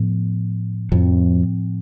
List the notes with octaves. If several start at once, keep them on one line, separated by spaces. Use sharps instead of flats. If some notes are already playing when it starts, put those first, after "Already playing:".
Already playing: A2 F3 B3
F2 A2 F3 C4